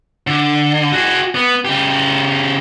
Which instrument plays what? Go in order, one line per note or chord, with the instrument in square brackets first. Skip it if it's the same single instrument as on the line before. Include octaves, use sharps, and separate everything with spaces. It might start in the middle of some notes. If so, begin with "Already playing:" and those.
[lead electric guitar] D3
F#4 G#4
B3
C#3 G4